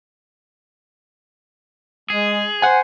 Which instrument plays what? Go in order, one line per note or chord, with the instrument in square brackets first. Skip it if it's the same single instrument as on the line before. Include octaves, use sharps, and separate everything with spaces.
[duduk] G#3 [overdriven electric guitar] G#4
[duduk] C5 [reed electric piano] F#5 G#5